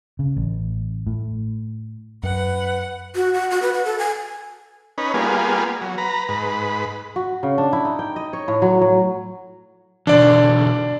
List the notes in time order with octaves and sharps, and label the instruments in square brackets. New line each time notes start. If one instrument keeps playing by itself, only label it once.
[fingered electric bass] C#3
A1
A2
[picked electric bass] F#2 [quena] B4 [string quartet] F#5
[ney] F#4
F#5
F#4
B4
F#5
A4
G#5
[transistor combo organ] C#4 D#4 B4
G3 A#3 B3 F4 G#4
F#3
B4 A#5
G#2 B4
[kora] F#4
C#3
D4
E4
D#4
G5
D#5
C#5
A2
F#3
F#3
[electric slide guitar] B2 D3 E3 [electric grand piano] D4 D5